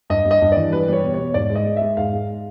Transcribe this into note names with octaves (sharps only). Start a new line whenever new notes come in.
G2 D#5
G3
D#5
G2
E3 D5
G3 B4
G3 C#5
B2
B2 C#5
G#2 D5
G#3
D#5
G#3
G#3 E5
G#2 F5
G#3